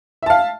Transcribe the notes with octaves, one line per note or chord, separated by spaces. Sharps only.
E5 F5 A5